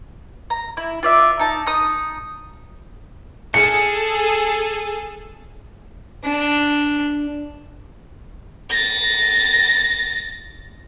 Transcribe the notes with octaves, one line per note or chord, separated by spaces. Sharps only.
A#5
E4
F4 D5 E5
D#4 A5
D#4 D#6
G#4 A4 C#7
D4
A6 A#6